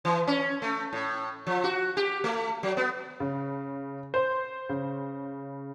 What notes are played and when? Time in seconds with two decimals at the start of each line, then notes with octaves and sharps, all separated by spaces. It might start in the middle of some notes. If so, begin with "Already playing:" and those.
0.05 E3
0.27 C#4
0.62 A3
0.93 A2
1.47 F3
1.64 F#4
1.97 G4
2.24 A3
2.63 F#3
2.77 B3
3.20 C#3
4.14 C5
4.69 C#3